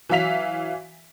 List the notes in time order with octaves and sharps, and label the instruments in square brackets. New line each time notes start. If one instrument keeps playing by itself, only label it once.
[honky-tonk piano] E3 F#3 E5 F5 B6 F7